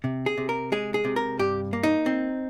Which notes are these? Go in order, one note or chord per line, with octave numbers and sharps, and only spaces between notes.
C3
G#4
C3
A#4
G#3 G#4
G#4
C3
A#4
G2 G4
A#3
D#4
C4